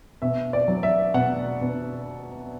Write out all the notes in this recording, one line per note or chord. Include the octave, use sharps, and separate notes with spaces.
B2 E5
D5
F#3
E5
B2 F#5
B2